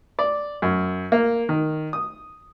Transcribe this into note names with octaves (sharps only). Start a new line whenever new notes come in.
D5
F#2
A#3
D#3
D#6